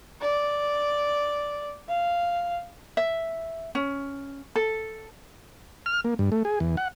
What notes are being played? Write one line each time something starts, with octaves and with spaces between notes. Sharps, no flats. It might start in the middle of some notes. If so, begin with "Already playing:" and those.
D5
F5
E5
C#4
A4
F6
A#3
G2
A3
G#4
E2
F#5